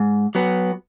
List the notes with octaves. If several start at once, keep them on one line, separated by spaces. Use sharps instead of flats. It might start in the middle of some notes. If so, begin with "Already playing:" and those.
Already playing: G#2
F#3 B3